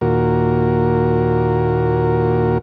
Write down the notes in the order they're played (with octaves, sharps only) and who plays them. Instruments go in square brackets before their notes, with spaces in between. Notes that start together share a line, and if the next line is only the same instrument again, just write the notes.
[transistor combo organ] D#2 A#2 F#4 A#4